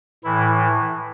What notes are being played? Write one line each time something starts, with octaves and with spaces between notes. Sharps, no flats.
A2 E3 E4